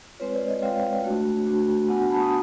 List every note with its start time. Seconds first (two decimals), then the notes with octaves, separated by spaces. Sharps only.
0.20 G#3 C4 F4 B4 C#5
0.34 C5 D5
0.48 C#5 D#5
0.62 G#3 C4 F4 F5 G5
1.04 A3 D4 F#4
1.46 A3 D4 F#4
1.88 B3 D4 F#4 F#5 G#5
2.09 A5 B5
2.20 C#6 D#6